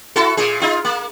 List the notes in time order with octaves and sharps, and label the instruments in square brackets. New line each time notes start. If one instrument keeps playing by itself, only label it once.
[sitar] E4 F#4 A4
A#2 G#4
D#4 F4
A#3